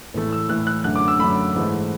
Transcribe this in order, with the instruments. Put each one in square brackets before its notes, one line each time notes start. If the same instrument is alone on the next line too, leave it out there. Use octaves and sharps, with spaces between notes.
[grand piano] A2 E3 A3
E6
A2 E3 A3 F#6
F#6
F#2 D3 A3 F#6
D6
E6
F#2 D3 A3 B5
G#2 E3 A3